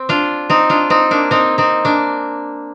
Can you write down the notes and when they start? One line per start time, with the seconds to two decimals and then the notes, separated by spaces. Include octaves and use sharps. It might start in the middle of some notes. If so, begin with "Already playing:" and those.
Already playing: C4
0.09 D4 F4
0.50 C4 D#4
0.70 D4 F4
0.90 C4 D#4
1.11 A#3 D4
1.31 C4 D#4
1.58 C4 D#4
1.85 A#3 D4